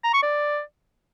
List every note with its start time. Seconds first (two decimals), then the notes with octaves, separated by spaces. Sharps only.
0.04 A#5
0.13 C#6
0.23 D5